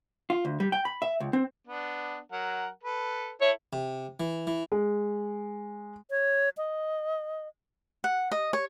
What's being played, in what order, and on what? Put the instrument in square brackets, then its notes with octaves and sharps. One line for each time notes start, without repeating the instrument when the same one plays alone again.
[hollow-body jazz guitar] F4
D2
G3
G5
B5
E5
C#2
C4
[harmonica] B3 D4
F#3 A#4 F#5
A4 B4
[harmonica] E4 A4 E5 [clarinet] C#5
[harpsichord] C3
E3
E3
[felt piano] G#3
[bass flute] C#5
D#5
[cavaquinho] F#5
D#5
C#5